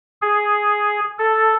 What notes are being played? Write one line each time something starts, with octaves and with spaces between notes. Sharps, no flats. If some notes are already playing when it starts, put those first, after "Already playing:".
G#4
A4